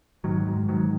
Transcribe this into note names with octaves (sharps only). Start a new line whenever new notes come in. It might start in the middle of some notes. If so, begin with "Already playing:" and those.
G#2 D#3 F#3
G#2
G#2 D#3 F#3